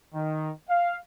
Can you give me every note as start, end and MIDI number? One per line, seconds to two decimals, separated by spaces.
0.14 0.50 51
0.69 0.96 77